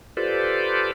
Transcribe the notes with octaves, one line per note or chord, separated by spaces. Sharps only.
F4 G4 A4 B4 C5 D5